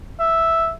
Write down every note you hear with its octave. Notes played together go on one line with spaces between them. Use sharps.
E5